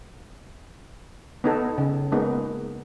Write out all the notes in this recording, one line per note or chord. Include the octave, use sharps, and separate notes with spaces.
B3 D#4 A4
C#3
G#3 A#3 B3 D#4